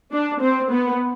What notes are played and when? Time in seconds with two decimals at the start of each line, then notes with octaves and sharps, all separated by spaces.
0.12 D4
0.41 C4
0.71 B3